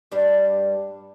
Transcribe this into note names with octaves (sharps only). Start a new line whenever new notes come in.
G2 G3 D4